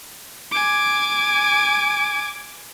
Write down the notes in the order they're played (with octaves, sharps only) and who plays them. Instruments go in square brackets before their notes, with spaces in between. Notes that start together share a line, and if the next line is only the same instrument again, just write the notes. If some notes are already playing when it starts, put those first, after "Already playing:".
[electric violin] G#5 D6